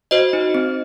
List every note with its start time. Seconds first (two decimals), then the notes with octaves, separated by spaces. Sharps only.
0.11 F#4 C5 D#5
0.33 D#4
0.55 C4